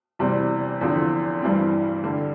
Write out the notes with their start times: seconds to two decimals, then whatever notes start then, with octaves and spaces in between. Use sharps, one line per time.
0.19 E2 C3 G3 C4
0.81 E2 D3 F3 C4
1.42 G2 E3 G3 C4
2.03 G2 D3 G3